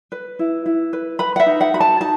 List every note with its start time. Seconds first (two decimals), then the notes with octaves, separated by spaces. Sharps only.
0.12 B4
0.39 E4
0.66 E4
0.93 B4
1.19 B4 B5
1.36 F#5
1.40 E5
1.46 D#4
1.61 F#5
1.74 F#4 B5
1.80 A5
2.01 D#4 A5